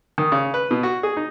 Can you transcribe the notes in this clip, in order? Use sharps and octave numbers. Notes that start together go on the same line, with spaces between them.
D#3
C#3
B4
B2
F#4
G#4
D#4